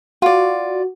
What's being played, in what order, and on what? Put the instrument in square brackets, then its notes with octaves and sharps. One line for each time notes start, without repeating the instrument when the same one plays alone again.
[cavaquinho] F4 D5 [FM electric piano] F#4